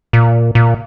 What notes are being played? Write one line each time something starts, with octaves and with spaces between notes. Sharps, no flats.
A#2
A#2